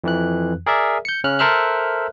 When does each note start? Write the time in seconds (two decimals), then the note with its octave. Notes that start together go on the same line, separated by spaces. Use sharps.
0.04 F2 E3 F#6
0.66 G#4 A#4 D5 E5
1.05 G6 C#7
1.24 C#3 C#4 F6 F#6
1.39 A4 A#4 C5 E5 F6 F#6